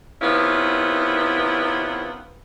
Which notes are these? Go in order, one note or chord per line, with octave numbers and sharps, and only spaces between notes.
C3 D#3 B3 C#4 E4 F4